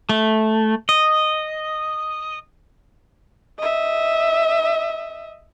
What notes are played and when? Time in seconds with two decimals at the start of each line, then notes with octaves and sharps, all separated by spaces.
0.09 A3
0.89 D#5
3.59 D#5 E5